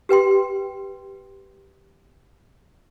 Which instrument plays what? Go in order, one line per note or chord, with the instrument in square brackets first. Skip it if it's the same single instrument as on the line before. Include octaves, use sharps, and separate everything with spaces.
[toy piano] G4 B4 G5 C6